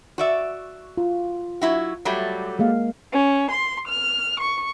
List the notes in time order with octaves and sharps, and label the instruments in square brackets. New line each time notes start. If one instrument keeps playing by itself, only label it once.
[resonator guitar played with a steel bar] F#4 D5 E5
[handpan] F4
[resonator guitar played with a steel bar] F#3 E4 F#4
F#3 G3 A3
[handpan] G#3 A#3 F5
[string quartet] C#4
C6
F6
C#6